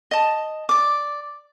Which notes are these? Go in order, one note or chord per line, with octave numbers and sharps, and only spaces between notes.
D#5 A5
D5 D6